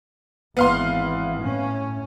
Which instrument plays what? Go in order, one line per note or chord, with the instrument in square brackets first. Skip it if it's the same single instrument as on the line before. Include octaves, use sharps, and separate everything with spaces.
[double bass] G#1 E3 [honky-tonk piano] B3 F5 C6
[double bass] A2 C#4